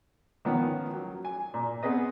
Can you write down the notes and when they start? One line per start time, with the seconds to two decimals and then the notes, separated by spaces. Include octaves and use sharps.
0.45 D#3 F3 B3 C#4
0.94 F#3
1.25 G#5
1.54 A#2
1.83 B3 C4 G#4 B4 D#5